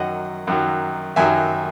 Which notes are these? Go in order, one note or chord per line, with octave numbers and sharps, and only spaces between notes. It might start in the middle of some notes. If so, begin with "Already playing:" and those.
Already playing: F#2 D#3 F#3 D#5 F#5
F#2 D#3 F#3
F#2 D#3 F#3 E5 G#5